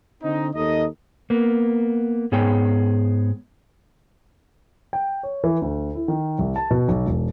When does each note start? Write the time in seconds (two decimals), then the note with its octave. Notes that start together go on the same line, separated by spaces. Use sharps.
0.22 D3 C4 D#4
0.54 D#2 D#4 A4 D#5
1.30 A#3 B3
2.32 G#2 B3 G#4 C#5 G5
4.93 G5
5.23 C#5
5.44 E3
5.62 D2
5.95 E4
6.08 D#3
6.39 C2
6.56 A5
6.71 B2
6.89 B1
7.06 E1